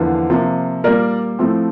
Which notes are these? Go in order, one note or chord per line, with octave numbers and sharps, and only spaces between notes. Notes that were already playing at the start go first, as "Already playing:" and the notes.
Already playing: E2 D3 F3 A#3
C3 F3 A#3
A#2 G3 A#3 A#4 D5
A2 F3 A3 C4